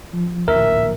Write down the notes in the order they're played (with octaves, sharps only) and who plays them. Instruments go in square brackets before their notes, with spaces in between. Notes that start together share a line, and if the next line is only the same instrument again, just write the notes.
[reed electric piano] F3
[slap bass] D1 A#1 D#2 [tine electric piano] A#4 [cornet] E5